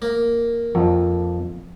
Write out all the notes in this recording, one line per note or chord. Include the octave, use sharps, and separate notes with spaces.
A#3
F2 F3